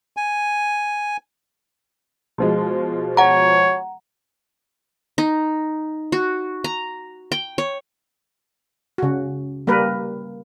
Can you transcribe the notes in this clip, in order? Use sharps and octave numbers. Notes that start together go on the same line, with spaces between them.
G#5
B2 F3 G#3
C#5 F#5 A#5
D#4
F#4
A#5
G5
C#5
C#3 F#4
G3 A#3 A#4 B4